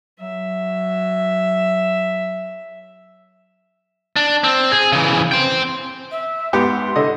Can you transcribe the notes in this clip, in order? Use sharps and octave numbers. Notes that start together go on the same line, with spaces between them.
F#3 E5
D4
C4
G#4
C#3 E3
C5 G5
E5
G#2 B3 G4 C6
D3 A4 D#5